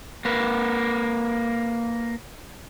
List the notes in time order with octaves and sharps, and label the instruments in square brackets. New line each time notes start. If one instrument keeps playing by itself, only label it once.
[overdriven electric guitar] A#3 B4